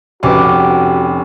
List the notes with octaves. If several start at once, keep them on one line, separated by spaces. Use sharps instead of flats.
F1 C#4 F#4 G4 B4 D6